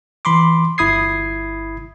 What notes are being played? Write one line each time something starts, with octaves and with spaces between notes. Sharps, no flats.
E3 B5 C6 D6
G1 E4 B5 D#6 G#6 C7